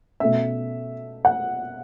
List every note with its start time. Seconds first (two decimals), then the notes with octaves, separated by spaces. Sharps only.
0.20 B2 A3 C#4 E5
1.25 F#5